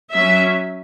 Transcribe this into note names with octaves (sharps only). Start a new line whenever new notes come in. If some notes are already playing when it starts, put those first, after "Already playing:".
F#3 C#4 E5